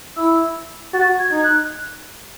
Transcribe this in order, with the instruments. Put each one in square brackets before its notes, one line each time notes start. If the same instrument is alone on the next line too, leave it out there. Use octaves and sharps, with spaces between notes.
[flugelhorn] E4 [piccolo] E6
[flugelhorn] F#4 [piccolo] A6
[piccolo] G#6
[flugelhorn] D#4 [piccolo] G#6
[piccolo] F#6